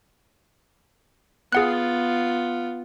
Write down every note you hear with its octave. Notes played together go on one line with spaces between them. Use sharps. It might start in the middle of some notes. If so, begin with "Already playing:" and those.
B3 F4 G#4 F#5 F#6